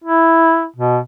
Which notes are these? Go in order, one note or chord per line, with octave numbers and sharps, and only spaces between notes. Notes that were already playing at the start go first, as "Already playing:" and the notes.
E4
B2